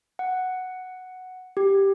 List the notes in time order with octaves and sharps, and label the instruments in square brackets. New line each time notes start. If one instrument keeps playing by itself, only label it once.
[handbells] F#5
G4